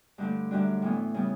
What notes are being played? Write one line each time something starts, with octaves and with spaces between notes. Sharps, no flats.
G2 D3 A3
F#2 D3 G3 D4 F#4
A2 E3 B3
C#3 G3 B3